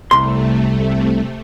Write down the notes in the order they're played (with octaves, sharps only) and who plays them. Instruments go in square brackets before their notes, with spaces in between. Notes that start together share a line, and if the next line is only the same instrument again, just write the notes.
[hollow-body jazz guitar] C2 C6 [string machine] C3 A3